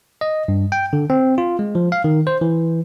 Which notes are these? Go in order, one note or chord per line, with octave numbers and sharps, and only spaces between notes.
D#5
G2
G5
D3
C4
F4
G#3
F3
F5
D#3
C5
E3